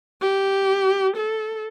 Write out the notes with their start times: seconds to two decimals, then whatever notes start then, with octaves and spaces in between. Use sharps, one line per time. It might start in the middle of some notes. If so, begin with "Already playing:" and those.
0.21 G4
1.16 A4